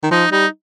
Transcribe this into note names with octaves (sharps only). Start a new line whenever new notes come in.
D#3
F3 D#4
G3 D#4